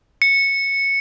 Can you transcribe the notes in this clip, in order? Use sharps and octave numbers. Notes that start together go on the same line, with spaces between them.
C#7